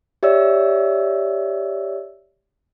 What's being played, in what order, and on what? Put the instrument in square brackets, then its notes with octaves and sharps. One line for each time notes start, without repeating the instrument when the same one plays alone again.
[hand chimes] G4 C#5 D5 E5 E6